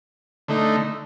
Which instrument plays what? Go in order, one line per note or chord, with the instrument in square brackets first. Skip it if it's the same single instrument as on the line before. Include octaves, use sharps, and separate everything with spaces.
[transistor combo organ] D3 A3 D#4